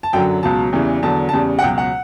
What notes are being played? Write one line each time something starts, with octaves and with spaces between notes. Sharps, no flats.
A5
F#2 D3 F#3 G5
C#2 B2 F#3 A5
E2 C#3 E3 G3
E2 D3 F#3 A5
E2 C#3 G3 A5
F#5
C#2 B2 F#3 G5
F#5